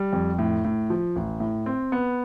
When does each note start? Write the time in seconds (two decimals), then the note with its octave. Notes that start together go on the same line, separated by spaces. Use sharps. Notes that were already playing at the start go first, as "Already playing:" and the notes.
Already playing: G3
0.13 F2
0.39 A2
0.65 A2
0.90 F3
1.16 A1
1.40 A2
1.66 C4
1.92 B3